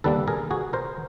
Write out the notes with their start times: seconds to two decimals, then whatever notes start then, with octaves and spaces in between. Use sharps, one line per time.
0.04 D#2 D3 G3 A#3 A4 B4
0.28 G#4 A#4
0.51 F#4 G#4
0.73 A#4 C5